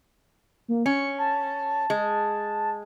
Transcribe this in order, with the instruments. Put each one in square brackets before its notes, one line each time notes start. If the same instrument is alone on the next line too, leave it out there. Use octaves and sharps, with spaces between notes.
[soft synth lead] A#3
[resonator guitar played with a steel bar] C#4 [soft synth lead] C#7
[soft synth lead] A5
[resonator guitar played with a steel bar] G#3